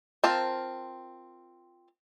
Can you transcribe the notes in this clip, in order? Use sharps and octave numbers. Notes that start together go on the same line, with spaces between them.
C4 F4 A#4 A5